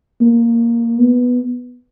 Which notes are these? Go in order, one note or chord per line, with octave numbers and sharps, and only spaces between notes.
A#3
B3